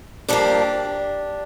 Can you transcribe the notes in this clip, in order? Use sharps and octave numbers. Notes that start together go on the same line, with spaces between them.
G2 F3 A#3 D4 G4